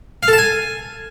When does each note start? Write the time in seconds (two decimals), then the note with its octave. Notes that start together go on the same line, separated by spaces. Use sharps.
0.23 F5
0.28 A4
0.33 A5
0.38 G#5